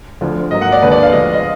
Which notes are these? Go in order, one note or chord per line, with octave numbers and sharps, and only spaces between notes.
D2 D3 F3
G#2 F#3 A#3 D#5
F#5
D5
D#2 D3 G#3 B4
D5
F5
D2 D3 F3 G#3 D#5
D#5